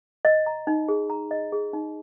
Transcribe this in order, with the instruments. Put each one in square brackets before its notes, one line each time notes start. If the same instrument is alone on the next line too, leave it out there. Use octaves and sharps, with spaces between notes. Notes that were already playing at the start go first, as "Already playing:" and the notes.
[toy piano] D#5
A#5
D#4
G#4
A#5
D#5
G#4
D#4